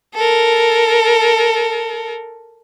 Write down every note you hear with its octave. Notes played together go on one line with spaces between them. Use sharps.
A4 A#4